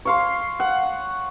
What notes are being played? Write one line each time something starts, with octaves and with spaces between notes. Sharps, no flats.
C#5 F5 C6
F#5